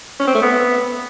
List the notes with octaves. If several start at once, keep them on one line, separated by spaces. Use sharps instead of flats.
C#4
C4
A3
B3